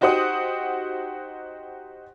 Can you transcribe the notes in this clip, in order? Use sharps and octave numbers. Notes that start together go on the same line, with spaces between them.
D#4 F#4 G4 C5 F#5 D#6